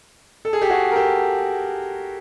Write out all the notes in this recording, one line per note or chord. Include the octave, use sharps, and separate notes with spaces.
A4
G#4
G4 A4
F#4 G#4
A#4
G4 A4